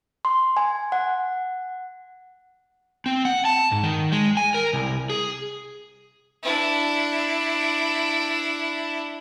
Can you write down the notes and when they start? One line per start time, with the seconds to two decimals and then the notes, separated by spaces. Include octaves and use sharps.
0.25 C6
0.57 G#5
0.92 F#5
3.06 C4
3.25 F#5
3.45 A5
3.72 G#2
3.84 D#3
4.12 G#3
4.37 G#5
4.54 A#4
4.73 C2
5.10 G#4
6.42 D4 E4